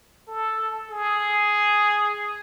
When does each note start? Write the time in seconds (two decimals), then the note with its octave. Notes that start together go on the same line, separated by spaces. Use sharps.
0.27 A4
0.90 G#4